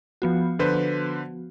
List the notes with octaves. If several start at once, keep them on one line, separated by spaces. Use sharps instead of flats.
F3 B3 F#4
D3 B4 C5